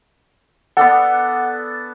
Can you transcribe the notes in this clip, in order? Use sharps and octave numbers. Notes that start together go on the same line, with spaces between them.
B3 D4 A4 F#5